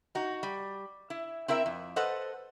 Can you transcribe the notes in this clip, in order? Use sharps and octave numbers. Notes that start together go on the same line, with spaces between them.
D#4 F#4
G3
E4
C4 E4 A#4 E5
F2
A4 B4 C5 D#5 F#5